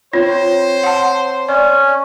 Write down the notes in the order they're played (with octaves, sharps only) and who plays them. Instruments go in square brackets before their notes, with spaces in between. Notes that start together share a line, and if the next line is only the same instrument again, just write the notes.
[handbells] C4 C#5 [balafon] F4 [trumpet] C5
[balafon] F#5 A5
[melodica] C#4 [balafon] D5